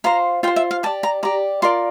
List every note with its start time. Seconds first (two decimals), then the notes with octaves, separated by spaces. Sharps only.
0.04 F4 C5 A#5
0.43 F4 G5
0.48 C5
0.56 E5
0.71 F5
0.83 G4 D5 A5
1.03 A#5
1.23 G4 D5 A#5
1.62 F4 A#4 D5 C6